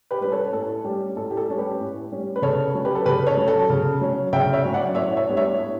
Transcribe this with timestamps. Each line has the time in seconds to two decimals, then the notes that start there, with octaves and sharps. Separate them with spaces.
0.11 G4 B4
0.21 G3 C#4 B4
0.32 A4 C#5
0.53 A2 A4
0.84 G3 C#4 G4
1.16 A2 A4
1.31 G4
1.37 A4
1.48 G3 C#4
1.58 G4 B4
1.80 A2
2.12 G3 C#4
2.36 B4
2.42 C#3 A4 C#5
2.75 F#3 C#4
2.85 G4 B4
2.95 A4
3.05 C#3 G4 B4
3.26 A4 C#5
3.37 F#3 C#4
3.48 A4
3.70 C#3
4.01 F#3 C#4
4.33 C#3 E5 G5
4.53 C#5 E5
4.64 F#3 C#4
4.74 D5 F#5
4.95 A2 C#5 E5
5.17 C#5 E5
5.27 G3 B3 D4
5.37 C#5 E5
5.58 A2